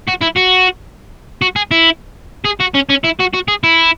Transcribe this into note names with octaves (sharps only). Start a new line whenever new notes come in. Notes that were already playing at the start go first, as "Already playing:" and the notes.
F#4
E4
F#4
F#4
G#4
E4
G#4
F#4
C#4
C#4
E4
F#4
F#4
G#4
E4